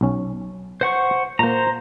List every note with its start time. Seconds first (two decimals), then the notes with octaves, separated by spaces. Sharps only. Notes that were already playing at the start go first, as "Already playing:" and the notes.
0.01 B1 C#4
0.81 C5 F#5 C#6
1.39 A#2 A#3 C5 A#5